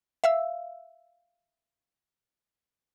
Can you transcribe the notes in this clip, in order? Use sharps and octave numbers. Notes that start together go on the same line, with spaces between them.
E5 F5 E6